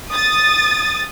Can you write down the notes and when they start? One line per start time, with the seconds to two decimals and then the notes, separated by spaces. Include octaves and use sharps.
0.11 D#6 A6